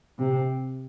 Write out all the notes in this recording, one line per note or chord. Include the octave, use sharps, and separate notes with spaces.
C3